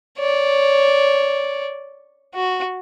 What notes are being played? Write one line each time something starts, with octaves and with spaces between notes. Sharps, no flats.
C#5 D5
F#4